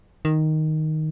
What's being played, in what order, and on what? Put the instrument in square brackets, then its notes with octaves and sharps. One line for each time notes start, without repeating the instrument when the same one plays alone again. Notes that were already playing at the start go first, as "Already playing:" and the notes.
[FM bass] D#3